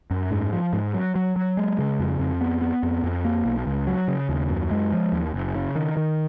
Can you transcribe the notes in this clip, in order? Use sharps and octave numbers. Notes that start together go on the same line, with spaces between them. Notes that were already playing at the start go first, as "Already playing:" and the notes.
F#2
G#2
F3
G#2
F#3
F#3
F#3
G#3
C#3
F2
F2
B3
B3
F2
F2
A#3
B1
C#2
F#3
C#3
D#2
F#2
G#3
F3
D#2
F#1
C#3
D#3
D#3